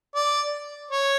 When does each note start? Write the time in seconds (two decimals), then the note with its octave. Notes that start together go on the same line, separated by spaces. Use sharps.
0.15 D5
0.91 C#5